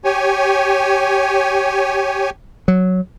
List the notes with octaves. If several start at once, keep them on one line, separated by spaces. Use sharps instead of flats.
G4 C#5 G#5
F#3